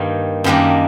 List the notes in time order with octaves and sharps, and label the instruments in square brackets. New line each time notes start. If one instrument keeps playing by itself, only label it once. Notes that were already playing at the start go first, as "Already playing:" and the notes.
Already playing: [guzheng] G2 D#3 G3 A#3
F#2 D#3 G3 A#3 D4